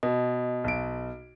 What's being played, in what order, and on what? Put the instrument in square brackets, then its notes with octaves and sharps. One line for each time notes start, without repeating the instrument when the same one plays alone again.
[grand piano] B2 [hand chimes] D#5
[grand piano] B1 D7